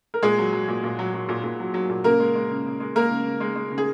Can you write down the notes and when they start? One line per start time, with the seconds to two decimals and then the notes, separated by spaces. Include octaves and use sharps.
0.14 A#4
0.23 A#2 G#3 G#4
0.38 F#3
0.53 F#3
0.68 A#2
0.84 A#2
0.99 F#3
1.14 F#3
1.29 A#2
1.44 A#2
1.60 F#3
1.74 F#3
1.89 A#2
2.04 C#3 A#3 A#4
2.20 G#3
2.35 G#3
2.51 C#3
2.66 C#3
2.80 G#3
2.95 G#3 A#3 A#4
3.11 C#3
3.25 C#3
3.40 G#3
3.56 G#3
3.72 C#3
3.78 G#4